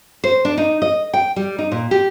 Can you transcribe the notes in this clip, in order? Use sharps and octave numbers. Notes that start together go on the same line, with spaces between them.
C5
D4
D#4
D#5
G5
G3
D#4
A#2
G4